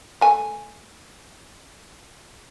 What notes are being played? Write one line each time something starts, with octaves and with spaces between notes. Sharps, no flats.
A3 G#5